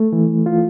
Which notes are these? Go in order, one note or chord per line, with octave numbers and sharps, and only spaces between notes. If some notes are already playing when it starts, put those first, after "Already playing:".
Already playing: A3
E3
F4